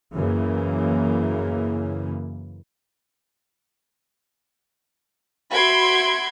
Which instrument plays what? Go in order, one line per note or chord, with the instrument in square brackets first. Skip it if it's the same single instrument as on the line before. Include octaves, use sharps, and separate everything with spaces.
[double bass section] F#2 C#3 E3 A#3
[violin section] F#4 E5 B5 C6 G#6 D7